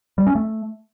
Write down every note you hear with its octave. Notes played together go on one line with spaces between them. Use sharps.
G3
C#4
A3